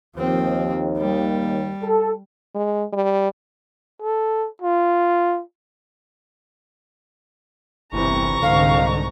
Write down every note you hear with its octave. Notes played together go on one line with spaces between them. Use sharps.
D#2 F3 C4
G3
A4
G#3
G3
A4
F4
G1 C2 C3 E3 A#5 C#6
C2 G#2 D3 F5